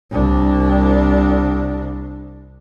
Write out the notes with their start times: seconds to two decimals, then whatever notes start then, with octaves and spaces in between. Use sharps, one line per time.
0.11 C2 D4